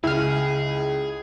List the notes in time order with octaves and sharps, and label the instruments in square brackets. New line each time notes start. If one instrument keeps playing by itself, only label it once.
[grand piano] C#2 [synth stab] E4 F6 [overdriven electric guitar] G#4